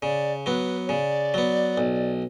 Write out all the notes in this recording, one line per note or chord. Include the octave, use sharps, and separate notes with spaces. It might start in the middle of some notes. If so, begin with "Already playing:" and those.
C#3 D5
F#3 B3 B4
C#5
C#3 D5
F#3 B3
B1